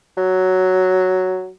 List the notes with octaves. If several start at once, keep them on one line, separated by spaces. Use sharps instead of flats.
F#3